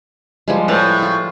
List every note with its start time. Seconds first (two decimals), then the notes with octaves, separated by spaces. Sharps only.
0.48 F3 G3 G#3
0.68 A2 B4 A5 A#5
1.02 F4